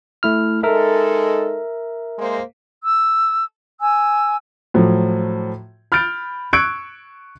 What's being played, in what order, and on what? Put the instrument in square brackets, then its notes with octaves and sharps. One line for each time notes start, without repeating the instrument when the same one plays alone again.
[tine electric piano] A3 E4 F6
[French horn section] G#3 D#4 A4 [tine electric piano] A#4 E5
[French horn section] G#3 A#3 C5
[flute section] E6
G#5 E6
[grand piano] A2 F3 F#3
B5 F6 G6 A6 D7
C#6 E6 F#6 G#6 C#7 D7